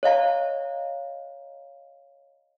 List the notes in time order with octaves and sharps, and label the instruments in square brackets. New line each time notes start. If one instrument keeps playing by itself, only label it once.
[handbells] C#5 D#5 F5 A#5